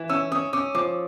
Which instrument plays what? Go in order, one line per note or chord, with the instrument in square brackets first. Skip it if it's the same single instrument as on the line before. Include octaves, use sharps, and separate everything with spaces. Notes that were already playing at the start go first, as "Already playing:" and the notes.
Already playing: [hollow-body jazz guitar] E3
[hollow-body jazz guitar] C#4 [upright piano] E6
[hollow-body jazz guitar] C#4 [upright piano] D#6
[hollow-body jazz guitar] C#4 [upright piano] D6
[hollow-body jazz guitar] F3 [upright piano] D6